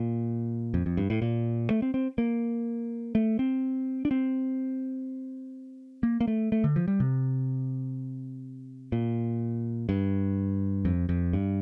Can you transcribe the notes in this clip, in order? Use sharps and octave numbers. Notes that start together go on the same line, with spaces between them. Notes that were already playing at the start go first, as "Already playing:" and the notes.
Already playing: A#2
F2
F2
G2
A2
A#2
A3
C4
C4
A#3
A3
C4
D4
C4
A#3
A#3
A3
A3
D3
F3
G3
C3
A#2
G2
F2
F2
G2